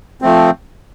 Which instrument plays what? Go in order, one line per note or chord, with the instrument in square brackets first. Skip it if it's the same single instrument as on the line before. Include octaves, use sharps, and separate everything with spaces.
[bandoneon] F3 A3 C4